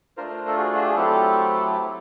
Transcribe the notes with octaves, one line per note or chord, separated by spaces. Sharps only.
A3 D4 F4 A#4 C5
A4
F#4 G#4
F#4
G4
G#4
F#3 A3 C4 E4 G4 A4